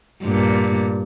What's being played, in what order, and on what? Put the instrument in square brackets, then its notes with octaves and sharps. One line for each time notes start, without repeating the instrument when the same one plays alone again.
[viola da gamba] G2 A#2